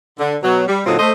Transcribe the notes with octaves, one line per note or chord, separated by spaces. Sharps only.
D3
B2 F#3
G3
A#2 D3 F#3 C4 D#4 F4
A3 C5 D#5